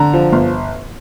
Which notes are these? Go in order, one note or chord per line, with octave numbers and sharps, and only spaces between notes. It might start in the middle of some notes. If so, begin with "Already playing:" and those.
Already playing: D3 A#5
F3
G1